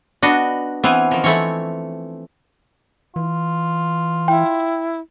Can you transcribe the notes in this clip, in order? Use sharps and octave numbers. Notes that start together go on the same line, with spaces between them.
B3 D4 F#4 D#5
E3 B3 C4 F5 G#5
D#3 F3
E3 A3 C4 C#5 B5
E3 F4
E4 G5